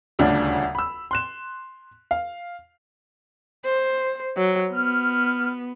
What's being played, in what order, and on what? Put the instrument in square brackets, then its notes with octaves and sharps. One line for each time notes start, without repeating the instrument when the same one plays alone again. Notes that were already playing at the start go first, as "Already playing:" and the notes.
[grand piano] D#1 D2 C#3 D4
B5 E6
C6 F#6 E7
F5
[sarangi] C5
F#3
[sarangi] B3 [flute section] F6